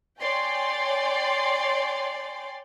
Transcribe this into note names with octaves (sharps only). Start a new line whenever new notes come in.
C#5 D5 G5 G#5 C6